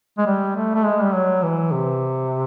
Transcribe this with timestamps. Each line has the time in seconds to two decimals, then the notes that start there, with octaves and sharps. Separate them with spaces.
0.18 G#3
0.27 G3
0.56 A3
0.75 A3
0.85 G#3
1.02 G3
1.14 F#3
1.43 E3
1.72 C3